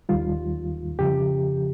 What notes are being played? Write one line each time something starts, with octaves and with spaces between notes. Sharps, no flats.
D#2 D#3 G3 F4
F2 C#3 F3 G4